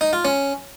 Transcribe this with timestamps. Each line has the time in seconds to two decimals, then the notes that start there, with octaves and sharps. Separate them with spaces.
0.01 D#4
0.13 F4
0.25 C#4